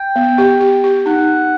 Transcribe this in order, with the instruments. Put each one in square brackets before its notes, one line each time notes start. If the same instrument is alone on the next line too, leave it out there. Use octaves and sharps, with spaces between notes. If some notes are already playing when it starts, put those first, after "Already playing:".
Already playing: [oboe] G5
[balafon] B3
G4
G4
G4
[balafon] D#4 [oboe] F#5